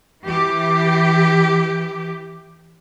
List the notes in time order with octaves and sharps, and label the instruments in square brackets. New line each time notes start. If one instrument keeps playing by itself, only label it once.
[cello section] E3 G4